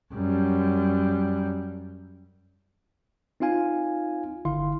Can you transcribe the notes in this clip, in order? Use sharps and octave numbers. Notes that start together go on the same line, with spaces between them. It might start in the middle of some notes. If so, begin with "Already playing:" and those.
F#2 G3
C4 D#4 F4 F5 G#5
G1 D3 E4 F5 C6